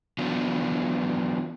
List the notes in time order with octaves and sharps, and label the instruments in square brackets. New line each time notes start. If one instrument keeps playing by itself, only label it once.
[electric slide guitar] E3 F#3 B3 D4 F4